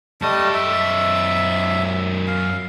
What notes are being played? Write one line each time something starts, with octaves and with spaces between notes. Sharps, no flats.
F#2 G3 A3 D#5 A5
E5
F5